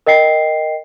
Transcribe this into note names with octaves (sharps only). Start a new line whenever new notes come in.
A#4 D#5 G5 C7